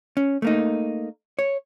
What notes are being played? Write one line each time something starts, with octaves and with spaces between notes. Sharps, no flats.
C#4
A3 A#3 D#4
C#5